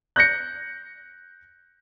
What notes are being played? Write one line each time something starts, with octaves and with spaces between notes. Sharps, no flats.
F#6 G6 A#6 C#7